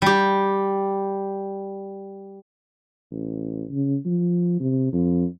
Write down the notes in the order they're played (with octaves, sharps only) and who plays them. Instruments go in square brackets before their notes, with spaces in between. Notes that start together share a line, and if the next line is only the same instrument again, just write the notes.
[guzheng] G3 G4
[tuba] A1
C#3
F3
C3
F2